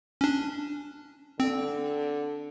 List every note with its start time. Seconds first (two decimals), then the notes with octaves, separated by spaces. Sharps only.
0.21 C#4 D4
1.40 D3 C4